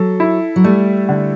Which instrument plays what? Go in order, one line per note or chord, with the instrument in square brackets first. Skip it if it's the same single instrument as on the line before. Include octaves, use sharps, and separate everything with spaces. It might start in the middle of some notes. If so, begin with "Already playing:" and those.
Already playing: [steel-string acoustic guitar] F#3 [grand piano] A4
[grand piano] E4
[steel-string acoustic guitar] F#3
[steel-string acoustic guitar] G3 [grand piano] A3
[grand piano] D3